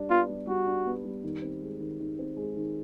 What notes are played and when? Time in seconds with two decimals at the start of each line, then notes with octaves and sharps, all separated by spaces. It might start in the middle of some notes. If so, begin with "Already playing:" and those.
Already playing: G3 D4
0.10 B3 F4
0.29 G3
0.47 G3 F#4
0.66 D4
0.86 B3
1.05 G3
1.24 D#3
1.42 C4
1.62 G#3
1.80 D#3
2.00 D#3
2.19 C4
2.37 G#3
2.57 D#3